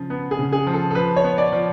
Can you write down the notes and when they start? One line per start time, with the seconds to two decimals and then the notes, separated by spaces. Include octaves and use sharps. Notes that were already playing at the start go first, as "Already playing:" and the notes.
Already playing: C#3 F3
0.10 B3
0.31 G#4
0.39 C#3
0.53 G#4
0.67 F3
0.73 A4
0.90 A4
0.95 F3 B4
1.16 C#5
1.24 B3
1.38 D5
1.52 F3